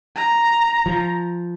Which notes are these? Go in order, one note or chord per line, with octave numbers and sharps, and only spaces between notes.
A#5
F3